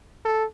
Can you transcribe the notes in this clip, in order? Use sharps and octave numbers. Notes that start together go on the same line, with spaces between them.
A4